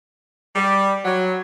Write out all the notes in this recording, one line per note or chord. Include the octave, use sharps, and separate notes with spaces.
G3
F#3